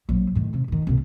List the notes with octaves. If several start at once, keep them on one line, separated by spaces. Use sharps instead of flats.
A#1 F#3
A2 D#3
C3
D3 D#3
C2 A#2